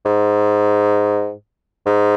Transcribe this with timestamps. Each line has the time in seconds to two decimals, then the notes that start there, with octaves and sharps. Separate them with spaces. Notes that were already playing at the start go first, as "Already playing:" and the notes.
0.06 G#2
1.86 G#2